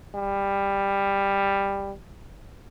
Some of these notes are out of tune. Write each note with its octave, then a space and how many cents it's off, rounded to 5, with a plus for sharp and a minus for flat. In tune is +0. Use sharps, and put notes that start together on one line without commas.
G3 +15